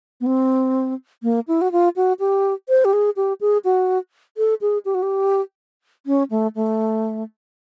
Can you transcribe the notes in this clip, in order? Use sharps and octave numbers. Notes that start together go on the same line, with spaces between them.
B3
C4
A#3
E4
F#4
F4
F#4
G4
C5
G4
G#4
G4
G#4
F#4
A4
G#4
G4
F#4
G4
C#4
A3
A3